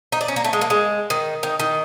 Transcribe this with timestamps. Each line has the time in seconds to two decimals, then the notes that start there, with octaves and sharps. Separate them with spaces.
0.12 D#4
0.21 D4
0.28 C#4
0.36 A#3
0.44 A3
0.53 G#3
0.61 A#3
0.70 G#3
1.10 D#3
1.43 D#3
1.59 D#3